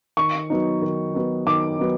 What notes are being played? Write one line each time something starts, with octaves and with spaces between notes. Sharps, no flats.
D#3 C#6
F#3 B3 D#4
D#3
F#3 B3 D#4
D#3 D6
F#3 B3 D#4